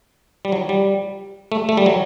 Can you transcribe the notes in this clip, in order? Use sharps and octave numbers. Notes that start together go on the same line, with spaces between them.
G3
F#3
G3
A3
A3
G3
F#3